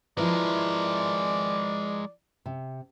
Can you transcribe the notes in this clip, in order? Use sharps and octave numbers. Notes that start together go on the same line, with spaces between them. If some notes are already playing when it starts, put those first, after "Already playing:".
F3 G#3 E4 A#4 B4 D5
C3